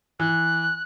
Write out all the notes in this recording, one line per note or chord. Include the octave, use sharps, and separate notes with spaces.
E3 F#6